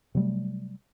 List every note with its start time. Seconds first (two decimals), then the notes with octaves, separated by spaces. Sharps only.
0.15 C3 F#3 G3 A3